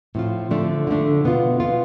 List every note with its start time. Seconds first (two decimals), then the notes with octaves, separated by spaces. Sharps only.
0.15 A2 F3 C4 F4
0.51 D3 F3 A3 D4
0.87 D3 F3 A3 D4
1.24 B2 B3 F4
1.60 B2 B3 F4